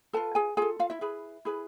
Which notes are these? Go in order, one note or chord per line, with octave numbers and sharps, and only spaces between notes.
F4 A4 B4 A5
G#4 G#5
F4 G#4 A4 G#5
F4 F5
E4 E5
E4 G#4 B4
E4 G#4 B4